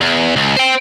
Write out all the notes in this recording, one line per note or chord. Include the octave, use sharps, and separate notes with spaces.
E2
C#2
C5 G5